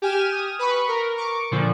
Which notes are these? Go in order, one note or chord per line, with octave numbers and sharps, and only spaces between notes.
G4 G#5 F6 D#7 E7
D#6
B4 B5 C#6
A#4
C#6 D6
A#2 D3 F3